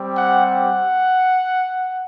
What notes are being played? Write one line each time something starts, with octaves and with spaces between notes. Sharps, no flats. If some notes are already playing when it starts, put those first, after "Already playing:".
Already playing: G3 C4 G4
F#5
F#5